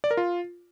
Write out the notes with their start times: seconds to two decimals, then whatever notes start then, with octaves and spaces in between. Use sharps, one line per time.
0.04 D5
0.11 A#4
0.17 F4